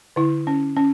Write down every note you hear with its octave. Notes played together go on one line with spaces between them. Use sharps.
D3 E4
C#4
C#4